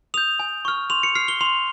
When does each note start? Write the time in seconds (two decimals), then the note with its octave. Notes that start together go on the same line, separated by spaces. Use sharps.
0.14 D#6 G6 F7
0.40 G#5
0.65 C#6 F6
0.90 C6 F7
1.03 C#7
1.15 F6 C7
1.28 G7
1.41 C6 F7